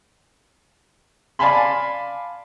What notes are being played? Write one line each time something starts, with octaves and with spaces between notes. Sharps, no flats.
D5 F5 G#5 A5 B5 C6